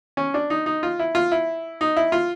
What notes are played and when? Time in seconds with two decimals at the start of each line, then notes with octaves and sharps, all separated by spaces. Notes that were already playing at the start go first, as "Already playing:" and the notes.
0.17 C#4
0.34 D4
0.50 D#4
0.66 D#4
0.83 F4
1.00 E4
1.15 F4
1.32 E4
1.81 D#4
1.97 E4
2.12 F4